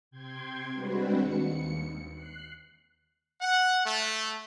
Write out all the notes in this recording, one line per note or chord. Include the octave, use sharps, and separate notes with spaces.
C3 G5 C6 G#6
G3 G#3 C4 D4 F#4 B4
D#2 C#7
F#6 C7
F#5
A3